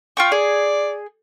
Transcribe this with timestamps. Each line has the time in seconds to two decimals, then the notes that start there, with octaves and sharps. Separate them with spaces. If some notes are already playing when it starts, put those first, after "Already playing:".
0.17 F4 G5 C#6
0.32 G#4 D5